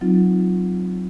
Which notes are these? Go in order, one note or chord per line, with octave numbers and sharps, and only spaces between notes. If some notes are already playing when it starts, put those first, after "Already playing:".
F#3 C4 D#4 F4